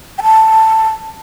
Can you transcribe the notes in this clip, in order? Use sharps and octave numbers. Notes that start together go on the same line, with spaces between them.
G5
A5